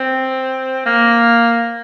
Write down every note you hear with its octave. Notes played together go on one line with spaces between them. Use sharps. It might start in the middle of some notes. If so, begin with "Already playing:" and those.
Already playing: C4
A#3